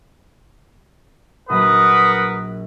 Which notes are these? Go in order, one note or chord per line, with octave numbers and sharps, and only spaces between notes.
A#1 F#3 A#4 B4 F#5 D#6